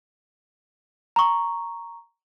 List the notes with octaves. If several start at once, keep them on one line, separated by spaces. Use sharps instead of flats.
A#5 C#6